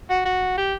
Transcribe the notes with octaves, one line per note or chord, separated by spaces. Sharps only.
F#4
F#4
G4